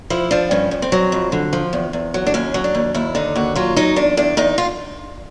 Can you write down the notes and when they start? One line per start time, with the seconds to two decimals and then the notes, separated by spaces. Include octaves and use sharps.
0.10 F3 E4
0.31 F3 D4
0.51 G2 C#4
0.71 G2
0.82 C4
0.92 F#3
1.12 F2
1.32 D3
1.53 F3
1.73 E2
1.93 E2
2.14 F#3
2.26 D4
2.34 D#2 C#4
2.54 F#3
2.64 D4
2.75 D#2
2.94 D#2 E4
3.15 D3 D#4
3.36 D#2 F#4
3.56 F#3 F4
3.76 F#3 D#4
3.96 E2 D4
4.17 E2 D4
4.37 E2 D#4
4.58 F4